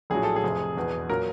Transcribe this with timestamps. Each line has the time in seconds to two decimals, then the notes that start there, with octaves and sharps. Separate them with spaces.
0.10 A#1 A2 F#3 G#4
0.23 A4
0.36 G#4
0.43 F1 F2 C3
0.76 E1 E2 B2
1.09 A#2 F#3 A#4